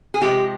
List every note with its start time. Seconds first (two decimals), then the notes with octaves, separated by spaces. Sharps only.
0.14 G#4
0.21 C3 F3 G#3 G4